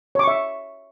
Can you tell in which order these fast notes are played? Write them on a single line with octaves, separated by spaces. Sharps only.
C#5 D6 C#6 E5